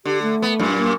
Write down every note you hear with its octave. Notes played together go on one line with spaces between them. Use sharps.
D3 G4
A3
B3
F#2 A#2
A#3